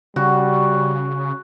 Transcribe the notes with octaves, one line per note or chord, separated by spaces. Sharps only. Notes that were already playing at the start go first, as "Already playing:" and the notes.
C#3 G3 F#4